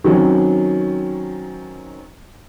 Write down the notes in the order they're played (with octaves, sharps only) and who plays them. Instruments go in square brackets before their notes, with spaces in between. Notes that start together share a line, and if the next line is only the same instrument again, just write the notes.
[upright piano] D#3 F#3 C4 C#4